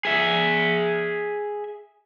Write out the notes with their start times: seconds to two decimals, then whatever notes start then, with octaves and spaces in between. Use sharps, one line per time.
0.05 G#4 E5